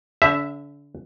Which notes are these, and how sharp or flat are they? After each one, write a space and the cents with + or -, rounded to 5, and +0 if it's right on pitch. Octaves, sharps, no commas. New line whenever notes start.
D3 -35 E5 +0